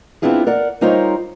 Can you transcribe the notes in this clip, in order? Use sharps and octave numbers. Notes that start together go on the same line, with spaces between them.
B3 C4 D4 E4 F4 G#4
A#4 D5 F#5
G3 D#4 F4 A#4 C5 C#5